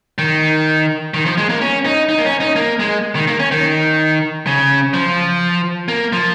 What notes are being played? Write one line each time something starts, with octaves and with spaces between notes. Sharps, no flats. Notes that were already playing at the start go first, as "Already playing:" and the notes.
D#3
D#3
F3
G#3
A#3
C#4
D#4
D#4
A#3
C#4
D#4
A#3
G#3
D#3
A#3
C#4
D#3
C#3
F3
A#3
F3